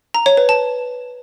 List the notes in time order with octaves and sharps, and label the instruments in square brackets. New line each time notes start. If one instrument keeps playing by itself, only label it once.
[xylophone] A#5
C#5
B4
A5